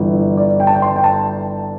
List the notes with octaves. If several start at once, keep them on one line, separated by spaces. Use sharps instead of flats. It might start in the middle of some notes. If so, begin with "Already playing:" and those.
Already playing: G1 G2 E3
D5
G5
A5
G5
C6
G5
A5